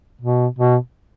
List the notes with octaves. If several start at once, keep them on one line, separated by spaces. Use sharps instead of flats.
B2
B2